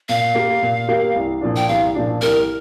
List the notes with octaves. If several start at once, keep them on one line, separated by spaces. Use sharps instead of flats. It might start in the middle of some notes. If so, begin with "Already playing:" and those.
A#2 F5
A#3 G4 A#4
A#2
A#3 G4 A#4
C2
A#2 F3 D4
G5
C2 F5
A#2 F3 D4
C2 A#4